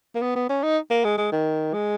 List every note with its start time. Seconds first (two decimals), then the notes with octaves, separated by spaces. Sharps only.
0.15 A#3
0.22 B3
0.35 B3
0.49 C#4
0.63 D#4
0.90 A#3
1.04 G#3
1.18 G#3
1.32 D#3
1.74 G#3